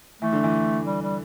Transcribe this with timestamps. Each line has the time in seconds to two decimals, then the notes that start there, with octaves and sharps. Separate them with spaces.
0.22 E3 A3
0.33 D3
0.44 E3
0.86 G3
1.02 G3